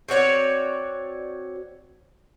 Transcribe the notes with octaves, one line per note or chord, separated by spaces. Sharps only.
C4 F#4 C#5 D5